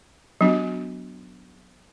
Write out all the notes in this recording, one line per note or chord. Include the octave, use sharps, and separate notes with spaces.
F#3 B3 D4 F#4